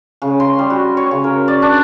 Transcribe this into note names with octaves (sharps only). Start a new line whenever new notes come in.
C#3
C6
G3
F#4
C#5
C#3
A#4
D5
D4